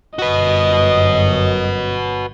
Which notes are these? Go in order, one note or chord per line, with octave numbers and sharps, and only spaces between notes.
G1 F#2 F#4 B4 D#5